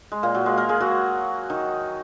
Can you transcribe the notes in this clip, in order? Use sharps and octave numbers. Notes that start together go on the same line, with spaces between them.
G#3
A#2 A#3
F#3
G#3
A#3 A#4
G#3 G#4
F#3 F#4
D#3 D#4